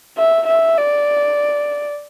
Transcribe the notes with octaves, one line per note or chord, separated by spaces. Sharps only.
E5
E5
D5